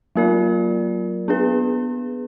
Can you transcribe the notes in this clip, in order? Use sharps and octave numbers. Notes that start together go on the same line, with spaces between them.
F#3 A#3 F4 A#4 D5
B3 D4 G#4 B4